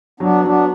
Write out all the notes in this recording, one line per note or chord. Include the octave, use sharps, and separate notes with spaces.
F#3 B3 D4
F#3 B3 D4